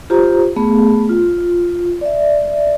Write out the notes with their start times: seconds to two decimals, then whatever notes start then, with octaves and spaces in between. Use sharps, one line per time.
0.10 F4 G4 C5 A#5
0.56 A3 B3 G#4
1.09 F4
2.01 D5 E5